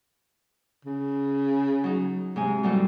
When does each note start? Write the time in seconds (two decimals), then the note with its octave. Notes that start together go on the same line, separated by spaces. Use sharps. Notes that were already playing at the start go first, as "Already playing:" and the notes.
0.85 C#3
1.84 F#3 D#4
2.36 G#2 C3 G#3 G#5
2.63 A2 F#3 G3